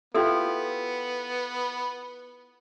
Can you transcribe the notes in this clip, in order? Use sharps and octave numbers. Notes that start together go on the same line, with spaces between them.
B3 E4 F4 G4 A4